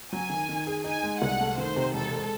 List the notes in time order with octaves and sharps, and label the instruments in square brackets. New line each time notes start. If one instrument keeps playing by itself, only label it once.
[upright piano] F#3 [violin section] G#5
[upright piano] D#3
D#3
G#4
[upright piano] D#4 [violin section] G#5
[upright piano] G#3
[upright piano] C2 [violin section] F#5
[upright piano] A3
[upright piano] D#3 [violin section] C5
[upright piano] C3
[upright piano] E1 [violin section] A4
[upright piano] G#3